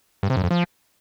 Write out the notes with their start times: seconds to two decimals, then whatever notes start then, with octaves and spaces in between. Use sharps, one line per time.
0.23 G2
0.30 C3
0.37 F#2
0.44 F2
0.51 F3